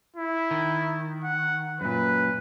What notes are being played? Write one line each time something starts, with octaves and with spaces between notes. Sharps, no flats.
E4
D#3
F#5
F#2 A#2 B4